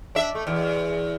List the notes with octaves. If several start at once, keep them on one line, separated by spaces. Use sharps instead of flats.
D4 E5
A3
E2